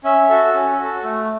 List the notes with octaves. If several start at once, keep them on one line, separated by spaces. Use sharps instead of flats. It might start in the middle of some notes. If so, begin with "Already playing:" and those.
C#4 E5
F#4 A4
C#4
F#4 A4
A3